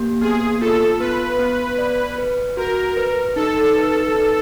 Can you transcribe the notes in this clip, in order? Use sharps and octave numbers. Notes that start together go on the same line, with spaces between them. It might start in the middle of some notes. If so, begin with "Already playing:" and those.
Already playing: A#3 G4
B3 G#4
F4 A4
B3 B4
B3
D5
B4
F#4 A#4
B4
D#4 A4
B4
D#4